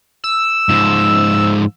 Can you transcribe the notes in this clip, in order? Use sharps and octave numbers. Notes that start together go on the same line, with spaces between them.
E6
G#2 F3